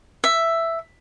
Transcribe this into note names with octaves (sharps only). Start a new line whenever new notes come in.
E5